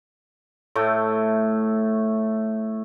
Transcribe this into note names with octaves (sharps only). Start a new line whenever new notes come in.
A2 A3